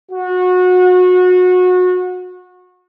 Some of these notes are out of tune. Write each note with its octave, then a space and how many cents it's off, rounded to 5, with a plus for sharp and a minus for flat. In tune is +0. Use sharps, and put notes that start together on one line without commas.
F#4 -25